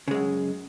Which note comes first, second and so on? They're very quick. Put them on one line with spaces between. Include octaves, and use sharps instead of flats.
C#3 G#3 F#2